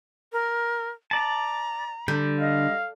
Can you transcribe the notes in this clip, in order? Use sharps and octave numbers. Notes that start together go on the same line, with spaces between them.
A#4
D5 A5 A#5
D3 G3 G6
D#5 F5